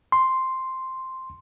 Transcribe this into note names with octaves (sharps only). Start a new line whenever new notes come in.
C6